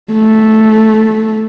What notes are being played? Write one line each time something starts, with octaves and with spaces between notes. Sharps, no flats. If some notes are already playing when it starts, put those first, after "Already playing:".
A3